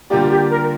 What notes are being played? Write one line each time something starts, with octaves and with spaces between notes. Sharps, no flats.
D3 G3 A#3 F4 G4 D5
G4
A#4